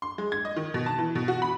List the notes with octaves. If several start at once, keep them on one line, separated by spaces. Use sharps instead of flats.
C6
G#3
G#6
D#5
D#3
B2
A5
E3
B2
F#4
B5